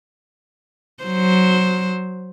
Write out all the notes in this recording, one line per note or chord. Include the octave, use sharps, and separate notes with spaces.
F#3 C5